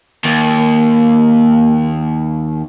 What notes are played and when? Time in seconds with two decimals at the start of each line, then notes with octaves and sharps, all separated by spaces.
0.24 D#2 A#3